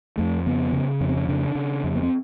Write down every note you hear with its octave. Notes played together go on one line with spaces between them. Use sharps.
F2 A3
C#3 B3
C#3
F2 C#4
C4
C#4
C#3 D4
C#3
F2
B3
C4